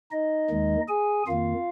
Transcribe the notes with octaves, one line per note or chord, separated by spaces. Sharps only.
D#4 D#5
D#2 D#3 G#3
G#4 G#5
F2 D#3 A#3 F4 F5